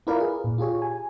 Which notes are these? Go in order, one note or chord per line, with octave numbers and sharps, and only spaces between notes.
E4 F4 A#4 B4 D5 F5
G#4
A#2
F4 G4 G#4 C#5
G#5